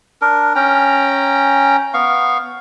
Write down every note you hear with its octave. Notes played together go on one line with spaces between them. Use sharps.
D4 A#4
C#4 G5 A#5
B3 F5 C#6